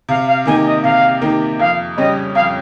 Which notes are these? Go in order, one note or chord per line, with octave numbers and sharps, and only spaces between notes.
C3 F5
F5
D#3 A#3 D#4 G4 G#5
D#5
C3 F5
D#3 A#3 D#4 G4
F2 F5
C#3 G3 C#4 G4 D#5
F2 F5